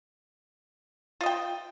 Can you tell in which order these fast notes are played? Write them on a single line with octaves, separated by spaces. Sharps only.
F4 D#5 G5